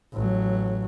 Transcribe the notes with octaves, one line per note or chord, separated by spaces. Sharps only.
A1 F#3